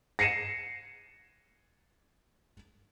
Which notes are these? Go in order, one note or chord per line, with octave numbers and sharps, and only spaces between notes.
A#6 C7 C#7 D#7 E7